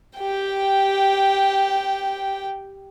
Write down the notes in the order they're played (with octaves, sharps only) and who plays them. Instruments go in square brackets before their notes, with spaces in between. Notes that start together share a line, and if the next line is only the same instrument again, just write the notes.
[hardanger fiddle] G4 G5